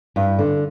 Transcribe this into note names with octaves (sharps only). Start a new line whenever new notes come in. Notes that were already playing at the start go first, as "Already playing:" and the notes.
G2
D3